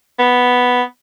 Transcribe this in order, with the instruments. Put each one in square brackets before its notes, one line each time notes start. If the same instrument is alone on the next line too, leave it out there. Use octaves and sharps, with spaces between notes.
[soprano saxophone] B3